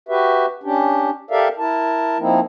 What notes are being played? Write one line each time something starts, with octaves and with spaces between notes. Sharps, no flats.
F#4 G4 B4 E5
C#4 D4 G4
G4 A4 A#4 D5 E5 F5
E4 A#4 A5
F3 A#3 C4 D#4 E4